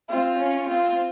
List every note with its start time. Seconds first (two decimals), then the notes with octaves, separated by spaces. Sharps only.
0.09 C4 F4
0.39 C#4
0.69 C4 F4